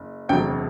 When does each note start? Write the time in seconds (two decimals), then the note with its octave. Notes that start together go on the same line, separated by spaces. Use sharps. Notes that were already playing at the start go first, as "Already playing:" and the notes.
Already playing: F#1
0.29 E1 D2 C3 F#3 G5